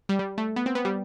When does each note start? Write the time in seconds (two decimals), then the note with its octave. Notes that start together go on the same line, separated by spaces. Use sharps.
0.09 G3
0.19 G3
0.38 A3
0.56 B3
0.66 C4
0.75 B3
0.85 G3